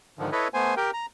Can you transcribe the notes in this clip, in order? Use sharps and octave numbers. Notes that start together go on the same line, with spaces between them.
G#2 D3 D#3 F3
E4 A4 B4 C#5 D#5
A3 B3 C5 G#5
G4 A#4 G5
A#5